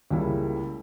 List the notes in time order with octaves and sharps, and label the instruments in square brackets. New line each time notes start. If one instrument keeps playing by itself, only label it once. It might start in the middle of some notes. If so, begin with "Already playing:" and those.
[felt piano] C#2 C#3 G3 A#3 E4